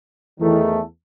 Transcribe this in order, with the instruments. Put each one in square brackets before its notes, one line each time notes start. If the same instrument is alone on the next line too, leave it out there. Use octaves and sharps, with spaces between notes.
[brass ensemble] E2 D#3 A3 [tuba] E3